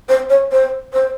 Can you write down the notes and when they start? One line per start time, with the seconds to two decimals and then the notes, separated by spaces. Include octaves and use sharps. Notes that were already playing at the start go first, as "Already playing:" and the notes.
0.09 C5
0.30 C#5
0.52 C5
0.93 C5